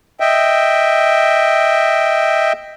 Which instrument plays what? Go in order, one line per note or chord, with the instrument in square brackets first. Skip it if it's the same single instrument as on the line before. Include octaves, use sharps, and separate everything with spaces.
[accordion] D#5 E5 G5